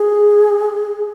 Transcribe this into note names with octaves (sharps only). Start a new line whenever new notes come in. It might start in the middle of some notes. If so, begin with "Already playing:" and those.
Already playing: G#4